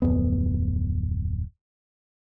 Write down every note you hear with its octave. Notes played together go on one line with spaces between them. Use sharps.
D1 G#1 F2 B3